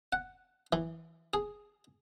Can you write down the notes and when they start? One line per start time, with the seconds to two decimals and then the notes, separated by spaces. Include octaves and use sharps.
0.13 F#5
0.73 E3
1.34 G#4